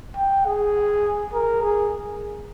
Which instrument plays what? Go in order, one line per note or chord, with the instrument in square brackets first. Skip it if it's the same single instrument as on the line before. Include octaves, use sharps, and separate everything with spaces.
[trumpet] G5
G#4
A#4
G#4